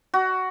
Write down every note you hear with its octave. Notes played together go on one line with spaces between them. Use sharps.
F#4